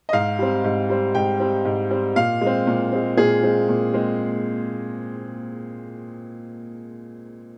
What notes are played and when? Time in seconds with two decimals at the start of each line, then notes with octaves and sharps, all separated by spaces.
0.09 D#5
0.13 G#2 F5
0.39 G3 C4
0.64 G#2
0.89 G3 C4
1.15 G#2 G5
1.40 G3 C4
1.65 G#2
1.90 G3 C4
2.16 A#2 F5
2.41 G#3 C4
2.67 A#2
2.92 G#3 C4
3.17 A#2 G#4
3.43 G#3 C4
3.69 A#2
3.94 G#3 C4